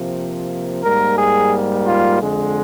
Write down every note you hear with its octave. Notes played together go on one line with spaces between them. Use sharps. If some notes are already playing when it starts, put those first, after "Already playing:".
Already playing: C3 F3 A#3
G#2 G3 A#3 A#4
G#4
F4
F2 D3 G#3